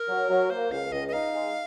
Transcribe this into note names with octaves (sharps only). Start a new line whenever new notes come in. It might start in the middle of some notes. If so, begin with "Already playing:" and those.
Already playing: A#4
F#3
F#3
A#3 C5
C#2 F5
C#2 D#5
D#5
D#4 F5
G#3